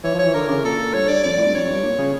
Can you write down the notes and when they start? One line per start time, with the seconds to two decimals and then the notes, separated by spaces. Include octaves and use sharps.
0.04 E3 C#5
0.14 F3
0.19 C#5
0.24 E3
0.34 D3 A#4
0.49 C#3
0.64 A#2 A4
0.94 G2 C#5
1.08 G2 D5
1.23 F2 D5
1.37 A2
1.45 G2
1.54 F2 C#5
1.64 F2
1.69 G2
1.84 A#2
1.99 C#3